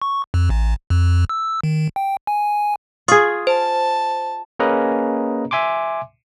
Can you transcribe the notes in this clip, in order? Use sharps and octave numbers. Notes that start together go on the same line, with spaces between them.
C#6
F2
A1
F2
E6
D#3
G5
G#5
F4 G#4 C#6 D#6
C5 A5
A#3 C#4 G#4 B4 D#5 A#5
E5 G#5 C6 D6